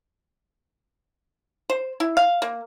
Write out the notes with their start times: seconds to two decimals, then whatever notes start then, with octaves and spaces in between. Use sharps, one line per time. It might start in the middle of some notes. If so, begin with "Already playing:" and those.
1.70 C5
2.00 E4
2.17 F5
2.42 A#3